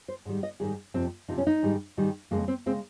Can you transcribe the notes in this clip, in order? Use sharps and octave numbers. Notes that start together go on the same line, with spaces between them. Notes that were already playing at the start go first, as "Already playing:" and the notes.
C5
G#2 D#3 G3
D#5
G#2 D#3 G3 G#4
F2 C3 F3 C4
F2 C3 F3 D#4
C#4
D#4
G#2 D#3 G3
G#2 D#3 G3
F2 C#3 G#3 A#3
C4
C#3 G#3 C4